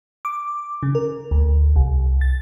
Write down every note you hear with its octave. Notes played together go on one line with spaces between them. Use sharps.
D6
C#3
A#4
D2
C2
A6